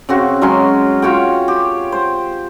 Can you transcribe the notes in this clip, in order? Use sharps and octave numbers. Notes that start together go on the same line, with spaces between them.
C#3 C4 F#4
F#3 G#3 C#4 C6
F4 F#4 C#5 G5
G4
C5